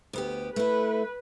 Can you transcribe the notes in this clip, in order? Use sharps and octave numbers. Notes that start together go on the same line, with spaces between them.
D2 B3 G4
A3 E4 B4